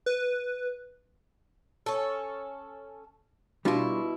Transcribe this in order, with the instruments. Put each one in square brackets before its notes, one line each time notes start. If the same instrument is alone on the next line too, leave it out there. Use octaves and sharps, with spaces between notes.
[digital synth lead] B4
[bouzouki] C#4 A4
[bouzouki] B2 E4 [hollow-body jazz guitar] G3 D4 F4